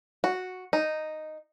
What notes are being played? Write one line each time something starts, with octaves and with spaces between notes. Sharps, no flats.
F#4
D#4